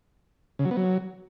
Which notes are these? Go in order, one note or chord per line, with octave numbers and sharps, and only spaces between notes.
C#3
F#3
B3
F#3